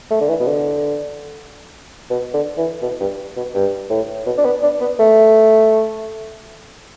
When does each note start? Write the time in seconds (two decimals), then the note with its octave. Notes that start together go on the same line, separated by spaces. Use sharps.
0.11 A3
0.21 D3
0.29 E3
0.40 B2
0.47 D3
2.10 B2
2.34 D3
2.58 E3
2.82 B2
3.01 G2
3.37 B2
3.55 G2
3.90 A2
4.26 B2
4.38 D4
4.45 B3
4.63 D4
4.81 B3
5.00 A3